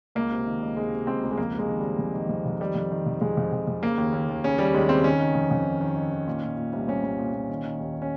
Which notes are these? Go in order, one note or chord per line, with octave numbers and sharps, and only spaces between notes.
C#2 A#3
C3
D#3
C#2
C3 G#3
C3
C#2 C4
C#2
G#3
F2 A#3
C3 G#3
D#3
C3 G3
F2
D#3
F2
F2
D#3 G3
F2
D#3
F2
F2 G#3
F2
F2
F2
C#3 A#3
D#2
D#2
D#2
C#3 C#4
D#2 G3
D#2 G#3
C#3 C4
D#3 C#4
D#3
F2
F2
D#3
D#3
D#3
D#3
A#2
A#2
A#2
C2
C2 C#4
C2
A#2
A#2
D#3
D#3
D#2
C#4